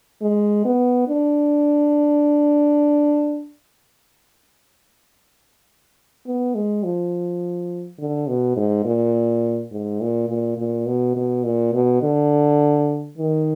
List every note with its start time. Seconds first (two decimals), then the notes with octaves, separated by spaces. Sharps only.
0.22 G#3
0.65 B3
1.08 D4
6.26 B3
6.55 G#3
6.84 F3
7.99 D3
8.28 B2
8.56 G#2
8.85 A#2
9.72 G#2
10.01 A#2
10.29 A#2
10.58 A#2
10.87 B2
11.16 B2
11.45 A#2
11.73 B2
12.03 D3
13.18 D#3